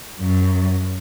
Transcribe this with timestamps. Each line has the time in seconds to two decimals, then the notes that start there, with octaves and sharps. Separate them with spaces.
0.20 F#2